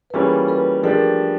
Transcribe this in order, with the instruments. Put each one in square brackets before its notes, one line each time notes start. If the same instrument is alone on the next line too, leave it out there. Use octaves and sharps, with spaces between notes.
[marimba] B4
[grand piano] E3 G3 A#3 C#4 F4 [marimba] G#4 A#4
[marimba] A4 B4
[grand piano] F3 A3 D4 G4 [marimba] G#4 A#4